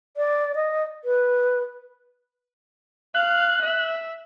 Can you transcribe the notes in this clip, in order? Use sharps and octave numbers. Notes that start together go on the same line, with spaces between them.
D5
D#5
B4
F5 F#6
E5